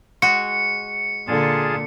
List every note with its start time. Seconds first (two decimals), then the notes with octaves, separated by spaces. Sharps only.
0.22 G#3 F#4 C#7
1.27 A#2 D3 F4 G#4 A5